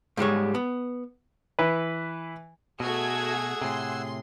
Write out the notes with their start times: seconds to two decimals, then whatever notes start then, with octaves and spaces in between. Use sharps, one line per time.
0.17 G#2 G3 G#3 C#5
0.55 B3
1.59 E3 B4
2.80 B2 A3 F#4 G#4 F#5 G#5 E6 G#6
3.62 A2 C3 C6